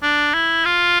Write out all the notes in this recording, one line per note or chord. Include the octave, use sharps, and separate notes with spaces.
D4
E4
F4